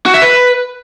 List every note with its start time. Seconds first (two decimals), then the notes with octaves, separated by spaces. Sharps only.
0.06 F#4
0.14 E5
0.22 B4